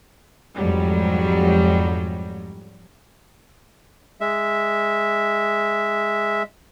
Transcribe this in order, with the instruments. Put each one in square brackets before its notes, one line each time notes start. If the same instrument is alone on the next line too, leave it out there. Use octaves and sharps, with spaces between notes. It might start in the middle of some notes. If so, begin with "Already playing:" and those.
[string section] F2 G#2 F#3 G3
[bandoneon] G#3 E5